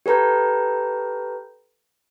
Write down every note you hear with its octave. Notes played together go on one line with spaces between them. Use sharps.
G4 A4 B4 A#5 G6